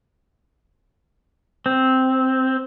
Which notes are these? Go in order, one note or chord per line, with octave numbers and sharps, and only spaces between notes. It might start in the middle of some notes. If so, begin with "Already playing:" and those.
C4